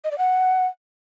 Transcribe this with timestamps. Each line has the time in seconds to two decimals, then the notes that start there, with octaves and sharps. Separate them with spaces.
0.04 D#5
0.11 D5
0.18 F#5